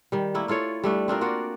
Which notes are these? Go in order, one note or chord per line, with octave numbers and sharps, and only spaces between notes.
D#3 G3
A3 A#3 E4
E4 F4 A4 C#5
G3 A3 D4
C4 D4 F4 A#4
A#3 F4 F#4 D5